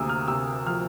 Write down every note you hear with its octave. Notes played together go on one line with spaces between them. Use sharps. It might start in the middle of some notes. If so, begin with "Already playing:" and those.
Already playing: D2 C3 A#3 D#6 E6
F6
C3 E6
F3 F6